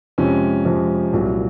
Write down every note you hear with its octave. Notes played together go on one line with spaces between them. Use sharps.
F2 C3 F3 G#3 C#4
F2 C3 F3 G#3 C#4
C2 A#2 F#3